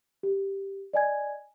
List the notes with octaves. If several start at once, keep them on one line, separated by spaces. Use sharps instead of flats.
G4
D5 D#5 G#5 G#6